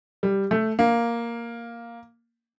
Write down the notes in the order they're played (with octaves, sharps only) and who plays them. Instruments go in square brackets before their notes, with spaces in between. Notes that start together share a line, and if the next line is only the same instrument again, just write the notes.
[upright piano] G3
A3
A#3